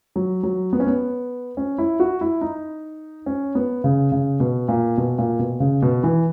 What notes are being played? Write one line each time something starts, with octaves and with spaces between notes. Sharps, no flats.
F#3
F#3
B3
C#4
B3
C#4
E4
F#4
E4
D#4
C#4
B3
C#3
C#3
B2
A#2
B2
A#2
B2
C#3
B2
E3